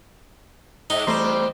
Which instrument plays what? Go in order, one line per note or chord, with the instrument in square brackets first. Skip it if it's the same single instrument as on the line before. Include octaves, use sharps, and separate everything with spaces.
[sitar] G#2 [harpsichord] D#4
[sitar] E2 C4 C5 [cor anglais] G3 [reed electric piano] A3 A#5 C6